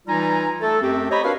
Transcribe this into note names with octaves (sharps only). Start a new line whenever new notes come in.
E3 G3 D#4 F4 G#5 A#5
A3 A4
F#2 A3 C4 G4
G4 C5 C#5 D#5 A#5 B5
D4 F#4 A#4 B4 F5